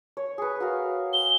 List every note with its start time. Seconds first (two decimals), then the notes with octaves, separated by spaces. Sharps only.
0.17 C#5
0.38 G#4 B4
0.60 F#4 A#4 F5
1.13 G7